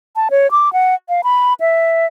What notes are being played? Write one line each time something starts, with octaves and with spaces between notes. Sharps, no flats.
A5
C#5
D6
F#5
F5
B5
E5